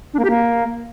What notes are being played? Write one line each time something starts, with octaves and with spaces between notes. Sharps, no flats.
D4
A#3
G4
A#3